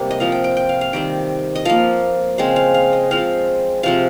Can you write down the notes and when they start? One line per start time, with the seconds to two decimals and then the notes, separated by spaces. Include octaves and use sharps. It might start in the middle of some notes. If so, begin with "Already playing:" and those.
Already playing: C3 G3 A#3
0.11 D#5
0.20 F3 C4 F5
0.32 G5
0.44 G5
0.57 G5
0.69 F5
0.81 F5
0.93 D#3 G3 C4 G5
1.55 D#5
1.65 F3 A#3 F5
2.38 C#3 G#3 C4 F5
2.56 F5
2.74 F5
2.93 D#5
3.11 F3 G#3 C4 F5
3.83 C3 F3 C4 F5